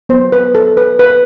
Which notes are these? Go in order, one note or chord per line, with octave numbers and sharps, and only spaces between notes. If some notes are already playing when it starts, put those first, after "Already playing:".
F#3 B3 C5
B4
A4
B4
B4